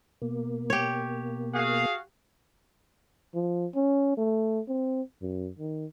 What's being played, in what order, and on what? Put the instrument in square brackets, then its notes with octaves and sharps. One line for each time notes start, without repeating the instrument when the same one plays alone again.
[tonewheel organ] B2 A#3
[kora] G4 C#5
[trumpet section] F#4 G#4 F5
[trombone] F3
C#4
A3
C4
F#2
D#3